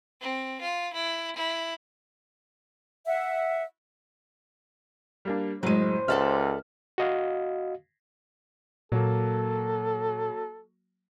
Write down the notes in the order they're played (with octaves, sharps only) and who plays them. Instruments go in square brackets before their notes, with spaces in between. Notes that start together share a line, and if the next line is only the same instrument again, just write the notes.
[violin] C4
F4
E4
E4
[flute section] E5 F#5
[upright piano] G3 A#3 D4
[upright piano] F#1 A2 D#7 [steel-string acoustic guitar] F#3 G#3 [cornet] C5
[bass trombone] C#2 [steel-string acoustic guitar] A4 D5 E5 [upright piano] F#5 F6
[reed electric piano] F#4 D#5 F5
[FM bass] A#2 [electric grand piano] F#3 A#3 [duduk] A4